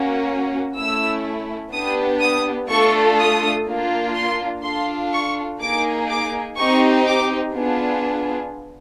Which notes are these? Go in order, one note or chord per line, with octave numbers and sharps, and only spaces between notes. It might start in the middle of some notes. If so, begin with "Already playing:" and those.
Already playing: A#3 C#4 F#4
A3 C#4 E4 E6
B3 D4 G4 D#6
D#6
A3 D4 F4 A4 C#6
D#6
A#3 D4 F4
C6
D4 F4 A4 C6
C#6
A#3 D#4 G#4 D6
D6
C4 D#4 G4 C#6
D6
B3 D4 F4 G#4